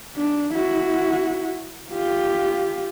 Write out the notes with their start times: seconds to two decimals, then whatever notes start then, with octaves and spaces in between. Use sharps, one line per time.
0.16 D4
0.54 E4 F#4
1.92 F4 G4